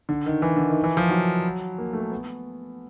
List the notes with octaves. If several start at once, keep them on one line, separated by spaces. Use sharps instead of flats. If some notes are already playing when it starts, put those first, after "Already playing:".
D3
D#3
E3
D3
D#3
E3
F3
F#3
A#3
A3
A#3
B3